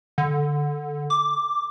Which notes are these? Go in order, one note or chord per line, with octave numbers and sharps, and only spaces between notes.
D3
D6